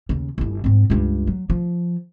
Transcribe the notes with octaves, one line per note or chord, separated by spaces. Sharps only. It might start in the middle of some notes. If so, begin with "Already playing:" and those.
D#2 C#3
G1 E4
G#2 C4
C#2 G2
F#3
F3